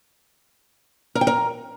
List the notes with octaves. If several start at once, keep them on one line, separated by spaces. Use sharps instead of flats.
A#4
G5
A#4